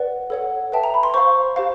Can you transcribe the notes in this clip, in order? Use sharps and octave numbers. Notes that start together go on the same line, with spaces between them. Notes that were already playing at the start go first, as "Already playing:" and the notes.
Already playing: B4 D5 F#5
A4 C#5 F#5
B4 E5 G5 A5
A#5
B5
C6
C5 F5 C#6
G4 C5 F5